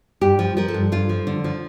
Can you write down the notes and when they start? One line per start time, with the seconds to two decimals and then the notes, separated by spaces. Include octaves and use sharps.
0.21 G2 G4
0.39 F3
0.57 F3 A#4
0.68 A4
0.74 G2
0.92 G2 F4
1.09 F3
1.27 D3
1.44 F3